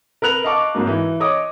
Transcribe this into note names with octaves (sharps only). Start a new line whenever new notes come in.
A#4 B4 F#6 F7
D#5 F5 A5 C#6 D6
G#2 F#3 A#3
E3
C#5 D#5 D6 D#6